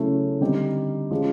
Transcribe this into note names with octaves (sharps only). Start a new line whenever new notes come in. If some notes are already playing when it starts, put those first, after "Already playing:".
Already playing: C#3 F#3 A3 C#4 E4
D3 G3 C4 D#4 G4
F3 G#3 C#4